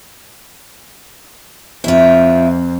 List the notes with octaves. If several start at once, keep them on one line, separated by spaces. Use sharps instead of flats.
F2 E4 F4